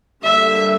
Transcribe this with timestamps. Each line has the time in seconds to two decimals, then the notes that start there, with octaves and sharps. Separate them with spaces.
0.24 D3 G3 A#3 E5